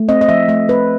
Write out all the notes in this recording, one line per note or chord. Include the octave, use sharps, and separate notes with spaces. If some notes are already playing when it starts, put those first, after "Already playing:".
Already playing: A3
C4 D#5
D#5
F3 E5
A3 E5
C4 B4